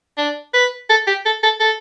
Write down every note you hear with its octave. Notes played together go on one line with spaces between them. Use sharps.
D4
B4
A4
G4
A4
A4
A4